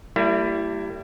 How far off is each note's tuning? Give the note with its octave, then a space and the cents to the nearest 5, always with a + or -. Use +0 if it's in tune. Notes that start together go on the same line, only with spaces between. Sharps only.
G3 -15 A#3 -45 E4 +15